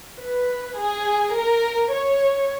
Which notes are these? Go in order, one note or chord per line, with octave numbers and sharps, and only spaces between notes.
B4
G#4
A#4
C#5